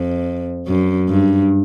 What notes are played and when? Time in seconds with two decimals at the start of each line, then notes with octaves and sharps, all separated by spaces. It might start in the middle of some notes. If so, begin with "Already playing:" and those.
Already playing: F2
0.67 F#2
1.09 G2